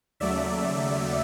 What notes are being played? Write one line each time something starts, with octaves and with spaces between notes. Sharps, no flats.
D#2 C#3 F#3 A3 D5 E5